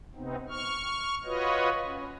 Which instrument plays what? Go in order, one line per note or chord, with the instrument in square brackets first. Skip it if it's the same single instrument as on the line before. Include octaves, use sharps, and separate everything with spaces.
[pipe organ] C3 B3 C4 D#4
C#6 F6
F4 F#4 B4 C#5 D#5
C#4